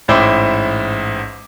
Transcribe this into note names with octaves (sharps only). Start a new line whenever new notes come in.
A1 G#2 E4 C5 G5 D6